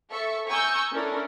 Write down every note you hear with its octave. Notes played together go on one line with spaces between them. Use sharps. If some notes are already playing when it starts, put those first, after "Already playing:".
A4 E5 C#6
G#5 A#5 C#6 D#6 E6 G6
C#4 D4 E4 A4 A#4